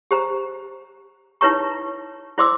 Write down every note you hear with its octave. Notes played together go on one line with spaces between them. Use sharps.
G4 C5 A#5
D#4 E4 B4 C#5 A#5 C#6
E4 C5 D5 C6 D6 E6